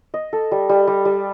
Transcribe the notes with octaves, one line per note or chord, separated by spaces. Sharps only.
D#5
A4
G3
G3
G3
G3